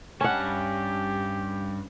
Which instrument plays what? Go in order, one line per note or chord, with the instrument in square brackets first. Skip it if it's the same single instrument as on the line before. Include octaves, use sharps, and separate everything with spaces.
[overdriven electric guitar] G2 A5 [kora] C#4 F#5 [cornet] G4